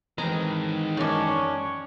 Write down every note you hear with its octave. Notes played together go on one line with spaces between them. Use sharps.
D#3 E3 G#3 C4 G#4 A#5
F#2 C#4 D4 C#5